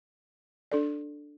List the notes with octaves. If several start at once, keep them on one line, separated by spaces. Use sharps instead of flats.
D4 A4 D5